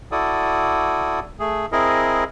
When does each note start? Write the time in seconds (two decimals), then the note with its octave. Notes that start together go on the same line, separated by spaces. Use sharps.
0.12 E4 F#4 A4 D5 D#6
1.40 A3 G#4
1.72 C4 E4 G#4 A#4 D#5